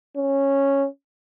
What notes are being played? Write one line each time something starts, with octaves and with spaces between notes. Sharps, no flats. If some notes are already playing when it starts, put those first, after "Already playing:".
C#4